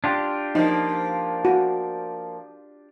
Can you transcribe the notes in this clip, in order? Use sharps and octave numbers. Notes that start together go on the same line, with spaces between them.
D4 F4 G4
F3 A#3 D#4
F#4